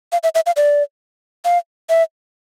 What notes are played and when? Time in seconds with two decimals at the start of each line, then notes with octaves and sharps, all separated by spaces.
0.12 F5
0.23 E5
0.35 E5
0.46 F5
0.56 D5
1.45 F5
1.90 E5